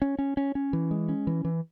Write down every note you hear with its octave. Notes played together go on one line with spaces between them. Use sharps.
C#4
C#4
C#4
C#4
E3
G#3
C#4
E3
E3